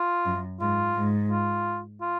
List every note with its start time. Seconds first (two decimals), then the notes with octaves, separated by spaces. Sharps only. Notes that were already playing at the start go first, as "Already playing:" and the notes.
Already playing: F4
0.25 F#2
0.61 G#2 F4
0.96 G#2
1.31 F4
2.02 F4